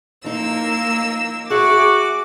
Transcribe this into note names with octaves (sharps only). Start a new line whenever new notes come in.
F3 A#3 D#4 E6
F#4 G#4 E5 D6